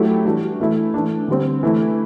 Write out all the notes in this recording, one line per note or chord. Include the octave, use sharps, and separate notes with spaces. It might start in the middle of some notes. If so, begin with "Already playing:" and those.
Already playing: F#3 A3 E4 G4
E3 G3 D4 F#4
E3 A3 E4
E3 A3 D4
D3 G3 C4
E3 A3 E4